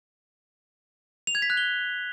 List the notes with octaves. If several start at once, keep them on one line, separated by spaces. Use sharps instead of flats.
F7
G#6
B6
F#6
G7